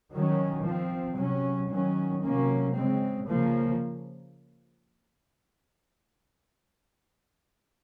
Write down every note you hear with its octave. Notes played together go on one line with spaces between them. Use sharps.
D#3 F#3 C#4
F3 C4
C3 F#3 C#4
D#3 F#3 C#4
C3 F#3 A#3 C#4
C#3 G#3 C4
C#3 F3 A#3